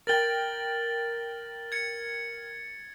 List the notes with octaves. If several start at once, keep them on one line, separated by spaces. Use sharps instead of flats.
A#4 G5 A6 F#7 G7
G#6 C#7